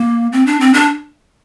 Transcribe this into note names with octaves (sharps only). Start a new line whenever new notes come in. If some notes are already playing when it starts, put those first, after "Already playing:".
Already playing: A#3
C4
D4
C4
D4